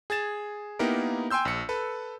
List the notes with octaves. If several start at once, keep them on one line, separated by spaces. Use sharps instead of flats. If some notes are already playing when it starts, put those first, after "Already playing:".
G#4 G#6 A6 E7
A#3 B3 D#4 E4 G4 A#4
G5 G#5 C6 E6 G6
A#1 C#7
A4 B4